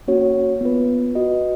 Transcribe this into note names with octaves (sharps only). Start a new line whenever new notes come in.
A#3 C#4 F#4 C#5
B3 F4 B4
F#4 B4 D#5